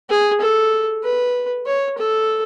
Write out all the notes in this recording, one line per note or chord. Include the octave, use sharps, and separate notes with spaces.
G#4
A4
B4
C#5
A4